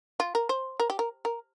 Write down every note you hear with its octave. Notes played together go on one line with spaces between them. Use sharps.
F4
A#4
C5
A#4
G4
A#4
A#4